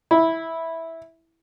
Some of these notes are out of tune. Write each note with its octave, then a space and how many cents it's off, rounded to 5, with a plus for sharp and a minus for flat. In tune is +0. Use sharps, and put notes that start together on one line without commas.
E4 -10